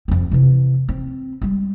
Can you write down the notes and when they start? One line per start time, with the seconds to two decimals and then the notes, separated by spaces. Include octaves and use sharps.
0.08 F2 C4
0.31 C3 E3
0.89 C4
1.42 G3 G#3